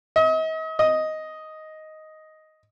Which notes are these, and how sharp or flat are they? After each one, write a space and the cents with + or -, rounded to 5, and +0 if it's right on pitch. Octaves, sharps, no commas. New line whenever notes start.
D#5 +40
D#5 +5